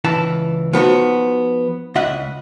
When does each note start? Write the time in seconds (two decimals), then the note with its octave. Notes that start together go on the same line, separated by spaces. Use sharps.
0.04 C#2 E3 A5
0.73 F3 B3 D#4 F#4
1.95 C#2 D#5 E5 F#5